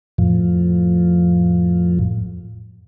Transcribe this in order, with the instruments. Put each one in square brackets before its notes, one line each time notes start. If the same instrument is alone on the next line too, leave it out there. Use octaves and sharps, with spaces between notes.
[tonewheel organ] F2 A2 F3